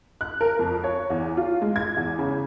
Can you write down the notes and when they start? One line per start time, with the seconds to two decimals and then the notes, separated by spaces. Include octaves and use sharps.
0.21 F#6
0.41 A#4
0.59 F2
0.84 C#5
1.10 E2
1.37 F4
1.62 G#3
1.76 G#6
1.97 E2
2.19 C#3